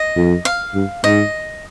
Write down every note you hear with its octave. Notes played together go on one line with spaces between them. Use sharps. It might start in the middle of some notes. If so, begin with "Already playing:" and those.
Already playing: D#5
F2
F5
G2
G#2 D#5